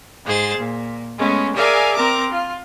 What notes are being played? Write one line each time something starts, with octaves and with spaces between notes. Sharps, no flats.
G#2 G#4 C5 A6
A#2
G#3 A3 B3 C#4
G#4 A#4 D5 E5 F5 G#5
C4 A#4 A#5 D6
F4